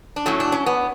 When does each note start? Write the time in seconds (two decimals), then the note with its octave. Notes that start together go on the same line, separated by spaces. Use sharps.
0.16 D4
0.26 A2 F#3 A3 C#4
0.40 D4
0.52 C#4
0.66 B3